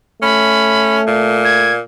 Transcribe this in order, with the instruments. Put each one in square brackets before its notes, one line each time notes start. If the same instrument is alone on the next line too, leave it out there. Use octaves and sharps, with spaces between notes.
[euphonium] A3 [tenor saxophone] C#4 [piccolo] B5
[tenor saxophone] A#2
[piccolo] G#6